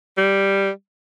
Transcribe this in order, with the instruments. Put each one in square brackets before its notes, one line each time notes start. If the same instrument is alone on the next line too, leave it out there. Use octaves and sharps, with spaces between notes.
[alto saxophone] G3